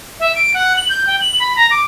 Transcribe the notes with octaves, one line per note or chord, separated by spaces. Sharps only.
E5
D7
F#5
F#7
G6
G5
F#7
B5
A#5
D6